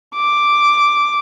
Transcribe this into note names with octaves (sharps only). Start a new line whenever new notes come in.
D6